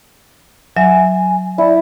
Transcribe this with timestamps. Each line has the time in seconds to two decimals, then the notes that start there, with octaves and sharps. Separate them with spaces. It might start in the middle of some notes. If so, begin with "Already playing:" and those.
0.77 F#3 E5 G#5
1.58 E4 D5